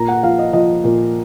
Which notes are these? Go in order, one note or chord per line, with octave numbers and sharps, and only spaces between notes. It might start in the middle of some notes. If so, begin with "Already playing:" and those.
Already playing: A#2 A#5
F#5
F3 F5
D#5
F3 D#5
A#2